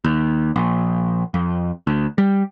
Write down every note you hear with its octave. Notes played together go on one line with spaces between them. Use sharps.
D#2
A#1
F2
D2
G3